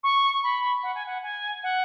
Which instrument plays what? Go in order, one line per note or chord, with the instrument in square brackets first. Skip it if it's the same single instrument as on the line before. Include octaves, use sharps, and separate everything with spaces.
[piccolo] C#6
B5
F#5
G#5
F#5
G#5
F#5